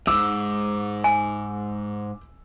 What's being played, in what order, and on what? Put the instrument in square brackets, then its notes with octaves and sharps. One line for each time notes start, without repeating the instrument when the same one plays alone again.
[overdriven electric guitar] F2 G#2 [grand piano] D6 E6
[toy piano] G#5